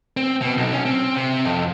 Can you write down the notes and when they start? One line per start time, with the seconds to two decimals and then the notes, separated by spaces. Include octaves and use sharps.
0.17 C4
0.41 B2
0.57 B1
0.73 C#4
0.85 C4
1.16 C3
1.45 F2